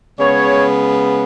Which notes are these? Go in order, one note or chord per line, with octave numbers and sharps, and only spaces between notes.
C#3 G#3 B3 C#5